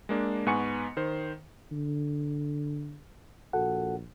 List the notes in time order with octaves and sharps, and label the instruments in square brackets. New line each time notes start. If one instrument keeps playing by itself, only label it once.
[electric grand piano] G#3 A#3 D4
G#2 B3 F#5 G#5 C#6 C#7
D#3 C5
[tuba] D3
[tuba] A#1 [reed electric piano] F#4 A4 F#5